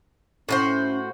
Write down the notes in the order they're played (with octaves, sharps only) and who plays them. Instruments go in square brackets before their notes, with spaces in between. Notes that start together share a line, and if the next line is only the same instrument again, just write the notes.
[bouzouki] A2 F#4 C5 [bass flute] C#4